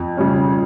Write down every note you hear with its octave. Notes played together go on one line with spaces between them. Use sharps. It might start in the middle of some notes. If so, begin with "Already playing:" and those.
Already playing: F2
C#3 G3 C#4